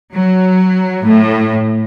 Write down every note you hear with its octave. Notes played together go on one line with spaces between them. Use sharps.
F#3
A2